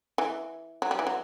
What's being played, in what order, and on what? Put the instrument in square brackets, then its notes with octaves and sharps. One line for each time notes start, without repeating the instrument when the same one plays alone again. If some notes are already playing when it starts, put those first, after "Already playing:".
[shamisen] E3
F#3
G3
E3
F#3